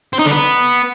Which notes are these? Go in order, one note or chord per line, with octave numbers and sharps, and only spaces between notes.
C4
D#4
D3
B3